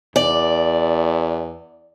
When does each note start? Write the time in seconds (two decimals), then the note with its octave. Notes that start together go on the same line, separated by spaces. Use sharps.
0.16 E2 D5